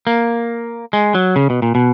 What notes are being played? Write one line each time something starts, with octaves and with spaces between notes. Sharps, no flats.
A#3
G#3
F#3
C#3
B2
A#2
B2